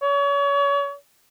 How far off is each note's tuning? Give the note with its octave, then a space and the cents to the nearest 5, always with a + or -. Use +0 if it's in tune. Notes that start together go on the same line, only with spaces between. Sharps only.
C#5 +35